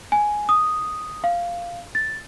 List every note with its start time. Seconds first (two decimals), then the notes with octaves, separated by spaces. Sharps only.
0.12 G#5
0.49 D#6
1.24 F5
1.95 A6